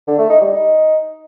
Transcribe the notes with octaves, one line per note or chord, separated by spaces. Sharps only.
D3
A3
D#4
G3
D#4